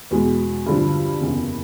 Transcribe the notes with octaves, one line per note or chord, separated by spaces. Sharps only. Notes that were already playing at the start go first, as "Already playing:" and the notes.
E2 B2 G#3
G2 D3 F3
F#1 E2 C#3